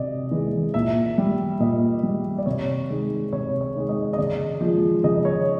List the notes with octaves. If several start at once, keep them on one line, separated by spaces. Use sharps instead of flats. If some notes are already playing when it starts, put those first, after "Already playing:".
Already playing: C3 D5 D#5
E3 G#3
A#2 E5
G3
A#2 D#5
G3
D5
C3 C#5
D#3 G#3
C3 C#5
C#5
D#3 G#3
D#5
D#5
C#3 D5
F3 G#3
C#3 D#5
C#5